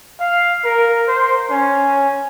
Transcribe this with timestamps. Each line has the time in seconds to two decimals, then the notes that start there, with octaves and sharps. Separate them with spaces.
0.20 F5
0.64 A#4
1.08 C5
1.50 C#4